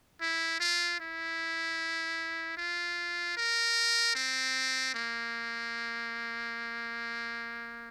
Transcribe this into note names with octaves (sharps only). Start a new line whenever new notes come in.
E4
F4
E4
F4
A#4
C4
A#3